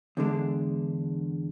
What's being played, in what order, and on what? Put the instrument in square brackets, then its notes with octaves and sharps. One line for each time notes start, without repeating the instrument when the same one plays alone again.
[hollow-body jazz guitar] E2 D3 G#3 D4